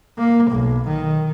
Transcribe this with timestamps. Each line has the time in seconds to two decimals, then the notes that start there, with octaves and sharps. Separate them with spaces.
0.18 A#3
0.50 B1
0.87 D#3